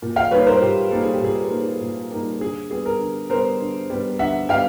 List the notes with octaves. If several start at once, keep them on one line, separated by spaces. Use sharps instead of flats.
A#2
F5 G5
G3 A#3 D#4 B4 C#5
A#4 C5
A#2 G4
G3 A#3 D#4 A4
G#4
G4
A#2 G#4
G3 A#3 D#4
A#2
G3 A#3 D#4
D3 G#4
G3 B3 G#4
G#4 A#4
D3
G3 B3 A#4 C5
D3
G3 B3
D3 E5 F#5
G3 B3 F5 G5